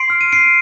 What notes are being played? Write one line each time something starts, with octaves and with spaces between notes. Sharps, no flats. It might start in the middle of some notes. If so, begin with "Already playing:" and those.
Already playing: C6 C7 D7
F6
D#7
C6 C7 D7